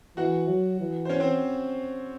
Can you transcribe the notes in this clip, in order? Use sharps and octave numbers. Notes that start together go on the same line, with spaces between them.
E3 F#4 F#5
F#3
E3
C5
C#4 C#5
C4 C5